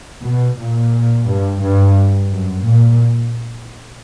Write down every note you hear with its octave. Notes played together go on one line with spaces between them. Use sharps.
B2
A#2
G2
G2
F#2
A#2